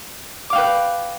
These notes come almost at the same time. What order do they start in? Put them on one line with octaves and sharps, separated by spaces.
D6 F5 G5 B4